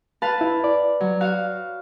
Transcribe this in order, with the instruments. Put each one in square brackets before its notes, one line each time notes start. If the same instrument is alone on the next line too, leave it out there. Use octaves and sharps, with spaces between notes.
[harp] B4 F5 A5
[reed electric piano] E4
D5
[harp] F#3
F#4 F5